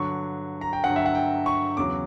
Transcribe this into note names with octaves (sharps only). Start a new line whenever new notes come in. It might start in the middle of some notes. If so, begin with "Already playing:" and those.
Already playing: G2 D3 F#3 C#6
A#5
G5
G2 D3 F#3 F#5
E5
F#5
G5
C#6
E2 C#3 F#3 D6